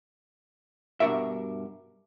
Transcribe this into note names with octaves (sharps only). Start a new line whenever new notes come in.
G2 B2 D4 F#4 A#4 E5